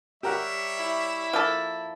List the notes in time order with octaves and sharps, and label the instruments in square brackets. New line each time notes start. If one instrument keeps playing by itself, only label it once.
[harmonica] G3 C#5 E5 [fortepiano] G4 A#4 F#5
[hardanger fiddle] E4
[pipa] F3 A#3 A4